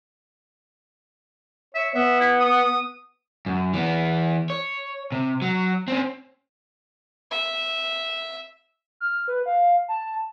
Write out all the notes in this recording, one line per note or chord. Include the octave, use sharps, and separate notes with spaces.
C#5 E5
B3 E5
E4
D#6
F#2
E3 B3
C#5
C3
F#3
C4 C#4
E5
F6
B4
F5
A5